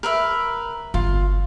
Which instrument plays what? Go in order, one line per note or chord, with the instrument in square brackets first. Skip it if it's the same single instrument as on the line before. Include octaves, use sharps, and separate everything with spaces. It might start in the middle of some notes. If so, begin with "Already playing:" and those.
[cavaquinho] A#4 B4 E5
[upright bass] G1 [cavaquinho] F4